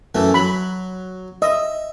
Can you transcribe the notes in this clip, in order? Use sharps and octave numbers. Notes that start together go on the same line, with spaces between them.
F#2 E3 A3
F#3 B5
D#5 E5